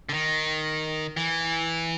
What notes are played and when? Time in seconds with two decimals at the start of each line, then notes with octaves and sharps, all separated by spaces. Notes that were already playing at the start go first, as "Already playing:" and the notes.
0.09 D3
0.13 D#3
1.17 E3